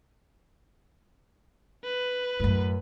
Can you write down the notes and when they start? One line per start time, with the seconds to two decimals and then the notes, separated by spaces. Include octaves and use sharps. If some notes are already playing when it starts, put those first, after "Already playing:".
1.84 B4
2.40 F#2 A2